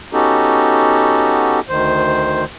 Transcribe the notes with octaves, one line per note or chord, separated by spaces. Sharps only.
B3 C#4 D#4 F#4 G4 A4
D2 D#3 C5